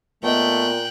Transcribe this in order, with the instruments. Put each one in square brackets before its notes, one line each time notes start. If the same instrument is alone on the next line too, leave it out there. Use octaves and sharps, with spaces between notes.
[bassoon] A#2 [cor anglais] A3 [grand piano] B3 D#5 [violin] G5 F#6